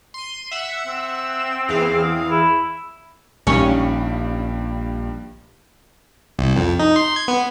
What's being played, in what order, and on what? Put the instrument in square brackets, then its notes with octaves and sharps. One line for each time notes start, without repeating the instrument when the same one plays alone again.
[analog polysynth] C6 D#7
E5 F#5 E6
[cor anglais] C4
[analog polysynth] E2 E3 F5 [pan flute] G#4
[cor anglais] E4
[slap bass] A#1 [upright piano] G2 D#3 G3 [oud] C#4
[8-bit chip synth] C2
F2
D#4
C6
G#6
B3